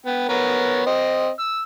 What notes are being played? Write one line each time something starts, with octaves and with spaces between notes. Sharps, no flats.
B3 G5
B3 A#4 C#5
C4 D#5
E6